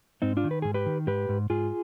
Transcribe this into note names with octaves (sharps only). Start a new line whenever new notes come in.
G#2 C4 D#4
D4 F4
D#3
B4
G#2 G#4
G4 B4
D#3
G#2 G4 B4
G#2
G#2 F4 G#4